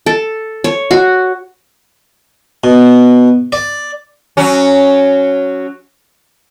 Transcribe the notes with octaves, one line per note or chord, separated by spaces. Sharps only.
A4
C#5
F#4
B2
D5
F#3 C#4